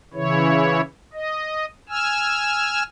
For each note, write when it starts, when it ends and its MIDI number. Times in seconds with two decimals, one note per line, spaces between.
0.14 0.81 49
0.14 0.81 52
0.14 0.81 64
0.14 0.81 73
1.14 1.65 75
1.89 2.83 80
1.89 2.83 88
1.89 2.83 89